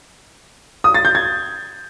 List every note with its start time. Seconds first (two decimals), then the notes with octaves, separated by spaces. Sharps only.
0.84 D#6
0.94 A6
1.05 G6
1.15 G#6